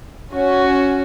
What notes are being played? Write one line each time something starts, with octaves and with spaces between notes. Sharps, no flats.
C#4 F#4